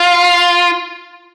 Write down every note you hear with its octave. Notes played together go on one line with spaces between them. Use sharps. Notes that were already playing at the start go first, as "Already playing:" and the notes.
Already playing: F4